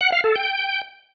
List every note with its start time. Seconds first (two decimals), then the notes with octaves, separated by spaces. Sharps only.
0.01 F#5
0.12 F5
0.24 A4
0.36 G5